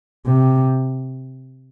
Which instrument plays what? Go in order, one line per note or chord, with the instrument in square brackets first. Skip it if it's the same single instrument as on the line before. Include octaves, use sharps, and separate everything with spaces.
[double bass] C3